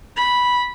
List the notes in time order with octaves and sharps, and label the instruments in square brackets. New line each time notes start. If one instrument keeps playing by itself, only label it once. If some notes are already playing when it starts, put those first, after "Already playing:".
[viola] B5